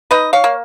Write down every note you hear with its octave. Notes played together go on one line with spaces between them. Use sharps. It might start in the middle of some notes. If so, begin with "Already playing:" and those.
D#4 B4 D#5
C#5 F5
A#3